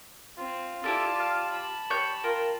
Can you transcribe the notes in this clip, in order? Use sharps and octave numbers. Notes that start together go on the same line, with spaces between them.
C4 F4
E4 G4 A4 D5 A5
G4 F5
A5 B5
G4 C#5 G6
F4 A#4 G5